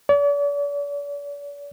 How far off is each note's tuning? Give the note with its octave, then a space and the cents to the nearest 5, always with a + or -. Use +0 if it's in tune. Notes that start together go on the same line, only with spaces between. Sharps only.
D5 -45